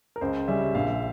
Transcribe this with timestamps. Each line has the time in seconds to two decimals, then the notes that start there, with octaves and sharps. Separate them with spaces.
0.16 A#4
0.21 C#2 C5
0.48 C#3 G3 C#4 E5
0.75 A#1 F5